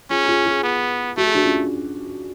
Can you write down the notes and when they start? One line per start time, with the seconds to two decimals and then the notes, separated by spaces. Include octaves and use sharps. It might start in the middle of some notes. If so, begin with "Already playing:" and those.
0.10 C#4 F4 G#4
0.28 F4 G#4
0.46 F4 G#4
0.63 B3
1.17 A3 F#4
1.26 G#4
1.35 D4 F#4
1.44 C#4 F4